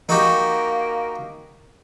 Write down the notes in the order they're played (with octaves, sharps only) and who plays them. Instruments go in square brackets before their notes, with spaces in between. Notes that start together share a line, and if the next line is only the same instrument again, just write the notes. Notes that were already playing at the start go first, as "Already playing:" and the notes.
[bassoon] A#3 [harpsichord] D#4 F#4 G4